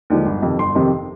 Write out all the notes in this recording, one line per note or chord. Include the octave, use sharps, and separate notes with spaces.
D#2 D3 F3 G#3
G1
F2 C3 D#3
G1 C6
F2 C3 D#3